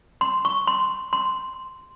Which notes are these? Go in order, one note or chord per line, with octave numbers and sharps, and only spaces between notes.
C6
C#6
C6
C6